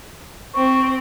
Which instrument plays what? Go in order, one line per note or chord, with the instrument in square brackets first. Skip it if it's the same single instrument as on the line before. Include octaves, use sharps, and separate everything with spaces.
[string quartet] C4 [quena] C#6